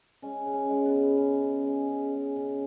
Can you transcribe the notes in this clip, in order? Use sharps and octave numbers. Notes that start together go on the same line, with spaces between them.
G#3 C#4
C#3
C#4
G#3
B3
C#3
G#3 C#4
C#3
G#3
C#3
G#3
C#3